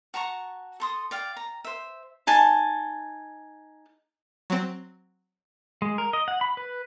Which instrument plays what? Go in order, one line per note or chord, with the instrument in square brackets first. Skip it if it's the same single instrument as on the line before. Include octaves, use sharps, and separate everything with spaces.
[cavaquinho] F#4 A5 A#5 C#6
A4 C6 D#6
D5 F5 G5
A#5
C5 E5
D#4 G#5 A5
[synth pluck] F#3 C4
[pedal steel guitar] G#3
A#4
D#5
F#5
B5
B4